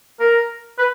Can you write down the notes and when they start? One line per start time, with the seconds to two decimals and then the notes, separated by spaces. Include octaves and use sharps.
0.20 A#4
0.78 B4